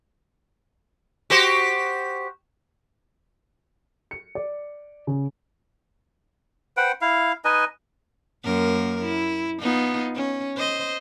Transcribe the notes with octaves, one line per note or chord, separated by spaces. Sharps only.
F#4 G4 C5
C#7
D5
C#3
B4 C5 F#5 G5
E4 F5
D#4 B4 D#5 G#5
F#2 A#3 A#4
E4
B3 D#4 F4
C#4
C5 D#5